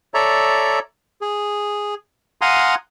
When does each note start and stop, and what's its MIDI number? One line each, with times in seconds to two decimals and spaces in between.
0.14 0.79 69
0.14 0.79 73
0.14 0.79 74
0.14 0.79 76
0.14 0.79 82
1.21 1.94 68
2.41 2.75 77
2.41 2.75 78
2.41 2.75 80
2.41 2.75 82
2.41 2.75 84
2.41 2.75 87